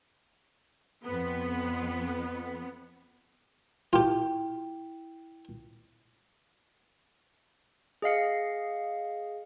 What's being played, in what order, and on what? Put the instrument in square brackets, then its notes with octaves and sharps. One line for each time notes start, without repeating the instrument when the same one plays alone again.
[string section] F2 B3
[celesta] E4 G5 [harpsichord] F4 G4
[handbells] G#4 D#5 F5 C#7